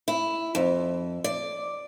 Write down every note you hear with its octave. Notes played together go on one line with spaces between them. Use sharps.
E4
F2
D5